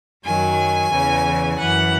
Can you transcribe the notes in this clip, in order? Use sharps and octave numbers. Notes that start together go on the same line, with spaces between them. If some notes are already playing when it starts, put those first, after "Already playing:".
F#2 D#3 F#3 G#5
E2 C#3 E3
F#2 E3 F#5